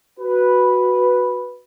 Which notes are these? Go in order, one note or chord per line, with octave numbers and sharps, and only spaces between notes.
F#4 B4